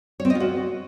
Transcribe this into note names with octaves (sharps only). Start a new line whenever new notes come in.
C#5
C4
D#5
F4
F#4